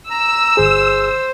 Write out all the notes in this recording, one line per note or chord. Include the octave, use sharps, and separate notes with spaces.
A#5 E6
G1 G#4 C5